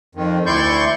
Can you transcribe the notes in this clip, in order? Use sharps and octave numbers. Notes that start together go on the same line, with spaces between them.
F2 D#3
D2 E4 D5 C6 C#6 G6